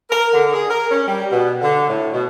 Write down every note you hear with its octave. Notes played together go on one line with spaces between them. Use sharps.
A#4
D3
G#4
A#4
C#4
G3
B2
D3
A2
B2